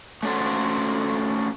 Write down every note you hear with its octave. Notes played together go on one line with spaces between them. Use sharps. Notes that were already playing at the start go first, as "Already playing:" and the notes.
A3 C#4 F#4 A4 C5